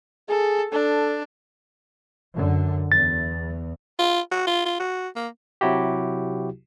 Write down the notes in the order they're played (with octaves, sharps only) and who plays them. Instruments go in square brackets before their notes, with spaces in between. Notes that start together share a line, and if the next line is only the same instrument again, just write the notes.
[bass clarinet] G#4 [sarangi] A4
[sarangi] D4 [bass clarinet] A4
[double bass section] F#2 D3
[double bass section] E2 [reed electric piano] A6
[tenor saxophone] F4
F#4
F4
F4
F#4
A#3
[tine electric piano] C3 F#3 E4 F#4 G4